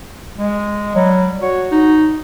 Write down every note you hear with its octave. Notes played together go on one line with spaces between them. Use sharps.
G#3
F#3 G3
F#4 C#5
D#4